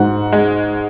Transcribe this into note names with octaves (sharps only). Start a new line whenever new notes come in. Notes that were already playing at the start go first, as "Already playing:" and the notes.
Already playing: G#2 F#4
G#3